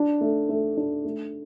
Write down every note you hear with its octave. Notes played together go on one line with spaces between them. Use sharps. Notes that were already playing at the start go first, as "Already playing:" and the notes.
Already playing: D4
A3
A3
D4
A3